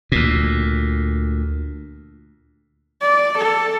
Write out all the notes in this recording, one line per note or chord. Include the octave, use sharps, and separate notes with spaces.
D2 A#2
D5
A4